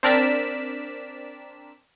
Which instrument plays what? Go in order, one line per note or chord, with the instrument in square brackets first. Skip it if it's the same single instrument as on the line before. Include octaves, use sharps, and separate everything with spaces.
[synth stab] C4 D4 A#4 D5 B6 E7